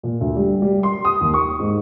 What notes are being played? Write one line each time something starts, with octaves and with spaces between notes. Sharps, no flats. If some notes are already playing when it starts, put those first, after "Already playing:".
A#2
D2
G3
G3
C6
D#6
D#2
C#6
G#2